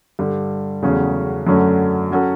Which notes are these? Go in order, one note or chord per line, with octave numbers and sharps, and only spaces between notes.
G2 D3 G3
E2 C#3 F#3 A3 C#4
F#2 D3 F#3 A3 C#4
F#3 C#4 F#4 A4